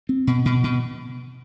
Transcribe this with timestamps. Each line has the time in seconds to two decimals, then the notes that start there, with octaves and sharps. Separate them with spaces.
0.09 C4
0.27 B2
0.45 B2
0.64 B2